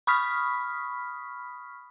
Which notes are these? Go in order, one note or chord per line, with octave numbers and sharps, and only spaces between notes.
B5 C#6 D#6 F6 B6